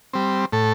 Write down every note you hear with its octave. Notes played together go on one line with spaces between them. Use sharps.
G3 C4
A2 A4